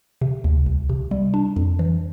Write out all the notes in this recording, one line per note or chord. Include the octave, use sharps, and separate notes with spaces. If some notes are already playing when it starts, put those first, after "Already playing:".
C3
D2
C2
C3
G3
D4
F2
E3